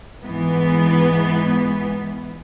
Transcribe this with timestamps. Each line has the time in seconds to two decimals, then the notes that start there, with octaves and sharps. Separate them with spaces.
0.24 G#2 E3 B3